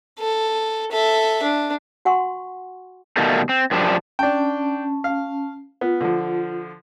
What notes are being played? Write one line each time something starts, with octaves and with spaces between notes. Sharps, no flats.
A4
A4 E5
D4
F#4 F#5 G#5 C6 C#6
B2 D#3 G3 A3 A#3
C4
F#2 F3 G3 D4
C#4 D4 G5 A5
F5
B3 F4
D3 F3